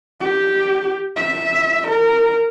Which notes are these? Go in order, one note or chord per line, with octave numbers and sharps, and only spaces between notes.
G4
E5
A#4